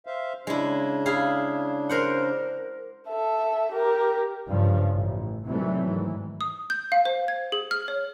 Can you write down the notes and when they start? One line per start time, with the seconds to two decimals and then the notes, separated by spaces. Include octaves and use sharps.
0.06 C5 E5 F5
0.47 C#3 G#3 D4 E4
1.06 E4 G#4 F5
1.89 A#4 C5 F#5
3.08 A4 E5
3.72 G4 A#4
4.48 G2 C#3 F3
4.92 A1
5.45 C3 D#3 E3 F#3 G3 A3
5.85 G#2 D#3 E3
6.41 D#6
6.70 G6
6.92 F5
7.05 C5
7.28 G#6
7.52 G#4
7.71 F6
7.88 C#5